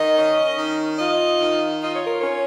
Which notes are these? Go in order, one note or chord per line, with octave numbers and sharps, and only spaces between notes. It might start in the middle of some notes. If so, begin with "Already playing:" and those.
Already playing: D#3 D#5
C#4
D#3
F4 D#5
D#3
F4 D#5
C#5
A#4
C#5
C#4